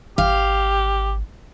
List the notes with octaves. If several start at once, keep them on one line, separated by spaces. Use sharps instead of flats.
G#1 G4 F5